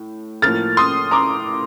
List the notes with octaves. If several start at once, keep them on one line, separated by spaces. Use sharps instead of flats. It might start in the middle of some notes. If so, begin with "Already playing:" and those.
Already playing: A2
A2 F3 A#3 F6 A6
C6 D#6
A#5 D6